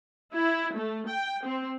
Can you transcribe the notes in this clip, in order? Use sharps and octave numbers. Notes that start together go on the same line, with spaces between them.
E4
A3
G5
C4